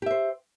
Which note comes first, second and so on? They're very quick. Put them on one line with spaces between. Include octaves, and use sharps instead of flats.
G4 E5 C5